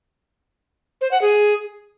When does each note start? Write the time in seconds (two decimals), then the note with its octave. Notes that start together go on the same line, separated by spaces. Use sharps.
1.01 C5
1.11 F#5
1.22 G#4